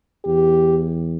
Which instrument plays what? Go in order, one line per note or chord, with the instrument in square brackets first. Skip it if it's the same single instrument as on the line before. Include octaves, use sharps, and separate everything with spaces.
[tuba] E2 [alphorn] G4